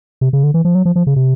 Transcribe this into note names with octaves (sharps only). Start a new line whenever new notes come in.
C3
C#3
D3
E3
F3
F#3
F3
F3
C#3
C3